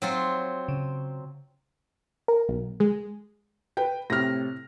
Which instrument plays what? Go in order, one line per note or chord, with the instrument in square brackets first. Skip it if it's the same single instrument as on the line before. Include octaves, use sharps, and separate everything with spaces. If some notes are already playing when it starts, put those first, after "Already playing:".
[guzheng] F#3 C4 F4
[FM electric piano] C#3
[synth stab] A#4
B1
G#3
[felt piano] B4 G5
[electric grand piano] A2 C3 [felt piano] F6 A#6